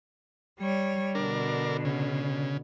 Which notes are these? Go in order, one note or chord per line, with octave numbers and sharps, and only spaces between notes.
G3 C#5
B2 D3 D4 A#4
C#3